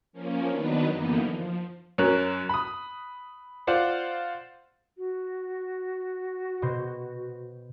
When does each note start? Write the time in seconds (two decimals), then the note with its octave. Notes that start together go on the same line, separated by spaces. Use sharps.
0.13 F3 A#3 C#4
0.50 D#3 F#3 B3 D4 D#4 B4
0.91 F#2 D3 E3 A#3 B3 D#4
1.28 F3
1.98 F#2 C#4 A#4 F#6
2.49 B5 D#6
3.67 F4 C5 D5 F#5
4.97 F#4
6.62 B2 C5